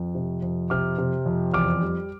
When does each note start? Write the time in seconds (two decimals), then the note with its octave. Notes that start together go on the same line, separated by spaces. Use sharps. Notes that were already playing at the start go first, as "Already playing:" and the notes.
Already playing: F2
0.15 C3
0.42 F2
0.70 C3 D6 F6
0.98 C3
1.26 F2
1.54 E2 D6 F6
1.81 G3